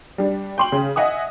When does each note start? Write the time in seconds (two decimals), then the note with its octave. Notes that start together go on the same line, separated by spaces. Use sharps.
0.18 G3 D4
0.58 G5 C6 F#7
0.72 C#3
0.96 D#5 E5 F#5 G#5 D#6